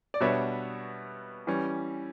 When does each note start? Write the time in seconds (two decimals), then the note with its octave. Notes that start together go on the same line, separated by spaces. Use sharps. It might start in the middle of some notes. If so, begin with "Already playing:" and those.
0.14 D5
0.20 B2 G3 B3 D4 C#5 E5
1.47 E3 G3 C#4